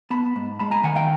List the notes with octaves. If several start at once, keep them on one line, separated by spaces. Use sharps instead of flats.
B3 A5 B5
G#2
G#3 A5 B5
G#5 A#5
D#3 F#5 G#5
F5 G5